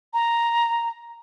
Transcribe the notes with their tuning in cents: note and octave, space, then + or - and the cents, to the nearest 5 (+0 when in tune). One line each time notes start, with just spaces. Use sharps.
A#5 +0